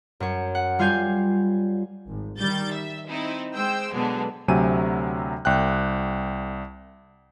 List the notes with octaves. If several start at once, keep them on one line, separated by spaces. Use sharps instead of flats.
F#2 C#5
F#5
G3 F4 F5 G#5 G6 C7
G#1
D#3 G3 G6 A6
E5
C4 D#4 E4
G#3 C5 G5 E6
B2 D3 F#3 G#3 B3
D2 C3 F#3 G#5 D#7
C2 G5 F#6